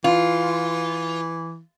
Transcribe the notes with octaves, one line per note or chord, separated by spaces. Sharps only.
E3 F4